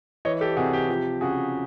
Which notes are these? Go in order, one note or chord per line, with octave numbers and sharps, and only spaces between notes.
E3 C#5 D#5
G4 A4
C3 F#4 G#4
G4
F3 G4
C#3 F#4 G#4